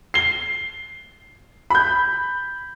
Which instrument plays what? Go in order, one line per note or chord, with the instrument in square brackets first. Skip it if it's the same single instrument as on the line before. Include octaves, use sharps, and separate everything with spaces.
[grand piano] C7 G7
B5 G6